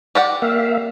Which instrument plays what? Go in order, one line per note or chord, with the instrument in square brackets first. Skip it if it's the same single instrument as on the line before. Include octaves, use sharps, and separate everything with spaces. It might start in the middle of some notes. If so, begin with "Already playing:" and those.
[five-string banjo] G4 D5 F#5
[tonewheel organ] A#3 E5 F5